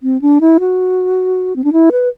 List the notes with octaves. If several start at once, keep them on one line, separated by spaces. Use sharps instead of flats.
C4
D4
E4
F#4
C4
D4
E4
B4